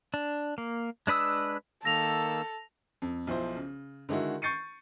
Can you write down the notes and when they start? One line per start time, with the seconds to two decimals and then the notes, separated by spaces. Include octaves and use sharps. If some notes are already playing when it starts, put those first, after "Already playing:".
0.14 D4
0.58 A#3
1.07 G#3 D4 B4 D#6 E6
1.85 D#3 A#3 A4 E6 A#6 F7
3.02 F2
3.27 B1 F3 E4 C5
3.56 C#3
4.09 D3 D#3 G#3 E4 F#4
4.42 C#6 G6 A6 C7 C#7 D#7